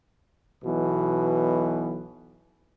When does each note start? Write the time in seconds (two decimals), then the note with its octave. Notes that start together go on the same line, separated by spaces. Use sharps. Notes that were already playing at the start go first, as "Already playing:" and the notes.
0.64 B1 B2 E3